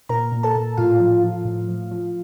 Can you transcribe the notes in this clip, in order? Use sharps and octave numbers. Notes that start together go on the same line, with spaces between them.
A#2 A#4 A#5
A#2
A4 A5
A#2
A2 F4 F5
F3
F3
A2
F3
F3